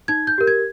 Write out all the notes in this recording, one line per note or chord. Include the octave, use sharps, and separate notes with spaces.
D#4 G#6
G6
G4 A#4
G#6